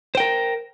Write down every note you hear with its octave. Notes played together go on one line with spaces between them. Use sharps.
A#4 C5 G5